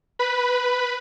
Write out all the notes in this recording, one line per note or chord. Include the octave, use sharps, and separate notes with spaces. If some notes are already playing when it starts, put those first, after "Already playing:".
B4 B5